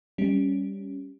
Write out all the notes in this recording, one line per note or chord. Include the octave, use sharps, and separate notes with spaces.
G3 C#4